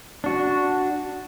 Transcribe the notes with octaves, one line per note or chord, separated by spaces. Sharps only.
D4 F#4